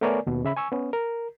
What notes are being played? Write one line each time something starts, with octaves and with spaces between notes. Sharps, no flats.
A3 B3 A#4 C#5 D5 G#5
D#2 B2
C#3 E5 B5
G#5 C#6 E6
B3 C#4
A#4